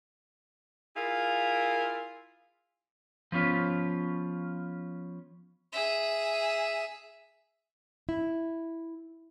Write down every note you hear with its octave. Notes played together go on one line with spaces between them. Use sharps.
E4 F4 G#4 A#4 F5
F3 B3 C#4 F4
G#4 E5
E4